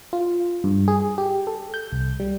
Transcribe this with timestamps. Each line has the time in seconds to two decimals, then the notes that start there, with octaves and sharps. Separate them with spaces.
0.13 F4
0.64 G2
0.88 G#4
1.18 G4
1.47 A4
1.74 G6
1.92 C2
2.20 G3